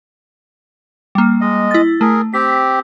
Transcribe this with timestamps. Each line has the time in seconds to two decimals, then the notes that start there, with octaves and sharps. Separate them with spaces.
1.15 G3 A#3
1.41 G#3 D#5
1.71 E4 A6
2.01 A3 G#4 A#4
2.34 C4 G4 B6